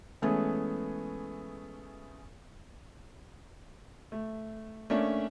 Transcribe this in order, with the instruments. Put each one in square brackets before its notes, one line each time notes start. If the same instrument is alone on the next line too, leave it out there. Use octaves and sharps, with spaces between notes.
[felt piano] E3 G#3 A3 B3 C#4 G#4
[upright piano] A3
A3 A#3 C#4 D4